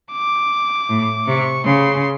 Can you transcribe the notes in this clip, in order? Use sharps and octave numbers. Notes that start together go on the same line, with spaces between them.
D6
A2
C3 C#6
C#3 C6